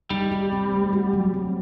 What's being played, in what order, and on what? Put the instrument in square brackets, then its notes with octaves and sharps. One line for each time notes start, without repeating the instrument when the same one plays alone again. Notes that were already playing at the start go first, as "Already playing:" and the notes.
[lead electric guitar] G3 [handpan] D#4
[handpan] G4
C4
A3
F#4
F#3
C4